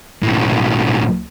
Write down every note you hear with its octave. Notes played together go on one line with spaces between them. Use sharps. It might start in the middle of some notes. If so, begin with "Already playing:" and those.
B1 A2